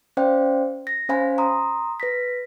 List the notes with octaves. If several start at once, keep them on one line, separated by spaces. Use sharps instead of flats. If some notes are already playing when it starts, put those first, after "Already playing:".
C#4 C5 D5 F5 G5
A#6
C#4 C5 F5 G#5 B5
A#5 C6 D#6
B4 A#6 B6